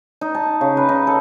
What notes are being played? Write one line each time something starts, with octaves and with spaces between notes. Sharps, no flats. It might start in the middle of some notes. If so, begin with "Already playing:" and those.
D#4
A5
C#3
B4
D#4
A4